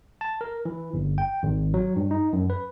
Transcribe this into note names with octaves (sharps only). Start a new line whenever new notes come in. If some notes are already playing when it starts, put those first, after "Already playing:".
A5
A#4
E3
G1
G5
G#1
F#3
G2
D#4
F#2
B4